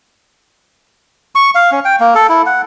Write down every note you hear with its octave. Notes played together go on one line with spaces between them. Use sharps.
C#6
F5
C#4
G5
A#3
A4
E4
F#5